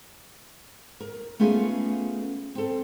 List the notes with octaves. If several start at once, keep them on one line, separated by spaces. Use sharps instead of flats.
A#4
A3 B3 C#4 F4 G#4 A4
C4 A4